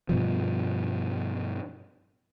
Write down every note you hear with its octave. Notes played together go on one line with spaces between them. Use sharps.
G2 B2 F3